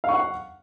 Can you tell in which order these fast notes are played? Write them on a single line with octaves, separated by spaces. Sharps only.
F5 C#6 F#5